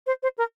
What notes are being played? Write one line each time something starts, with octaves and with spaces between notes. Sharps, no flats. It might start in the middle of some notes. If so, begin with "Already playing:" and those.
C5
C5
A#4